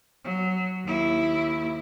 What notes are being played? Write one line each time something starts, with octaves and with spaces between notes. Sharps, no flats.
F#3
D#2 E4